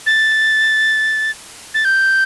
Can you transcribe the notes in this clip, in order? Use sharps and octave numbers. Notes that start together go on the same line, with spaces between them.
A6
A6
G6